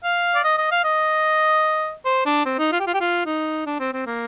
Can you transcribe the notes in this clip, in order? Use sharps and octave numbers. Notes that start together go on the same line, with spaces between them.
F5
D5
D#5
D#5
F5
D#5
C5
D4
C4
D#4
F4
G4
F4
G4
F4
D#4
D4
C4
C4
A#3